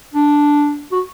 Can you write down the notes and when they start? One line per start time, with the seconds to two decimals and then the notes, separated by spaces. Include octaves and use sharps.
0.14 D4
0.92 F#4